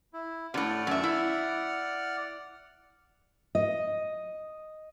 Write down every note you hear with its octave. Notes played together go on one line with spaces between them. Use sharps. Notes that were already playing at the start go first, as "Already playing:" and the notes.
E4
A2 C3 D5 F#5 F6
F#2 E5
E4
D#5